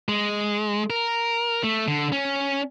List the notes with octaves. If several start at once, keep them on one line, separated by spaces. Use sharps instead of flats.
G#3
A#4
A3
D3
C#4